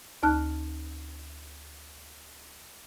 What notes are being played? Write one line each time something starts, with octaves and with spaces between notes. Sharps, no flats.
D2 D#4 A5 F6 F#6